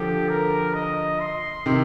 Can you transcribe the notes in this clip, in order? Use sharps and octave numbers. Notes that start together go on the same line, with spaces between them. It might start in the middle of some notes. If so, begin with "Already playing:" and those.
Already playing: D3 F3 G4
A#4
D#5
C6
C3 D#3